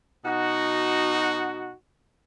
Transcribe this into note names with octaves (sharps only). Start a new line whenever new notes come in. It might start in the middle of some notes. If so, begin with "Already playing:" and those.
B2 D#4 F#4